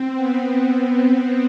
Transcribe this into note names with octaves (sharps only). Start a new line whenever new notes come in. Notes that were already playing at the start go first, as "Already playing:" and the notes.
Already playing: C4
B3
C4